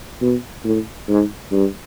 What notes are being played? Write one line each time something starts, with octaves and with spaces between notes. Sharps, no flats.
B2
A2
G#2
G2